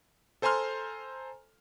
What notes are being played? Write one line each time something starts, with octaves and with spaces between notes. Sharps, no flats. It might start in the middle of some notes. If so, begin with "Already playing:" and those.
A4 C5 G#5 A#5 C6 F6